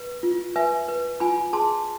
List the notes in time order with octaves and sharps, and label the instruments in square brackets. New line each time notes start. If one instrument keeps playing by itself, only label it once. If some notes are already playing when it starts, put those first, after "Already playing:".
Already playing: [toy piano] B4
F4
B4 E5 G#5
B4
F4 G#5 B5
G#4 A5 C6